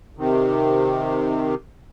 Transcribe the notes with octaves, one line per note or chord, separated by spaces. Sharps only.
C3 D#3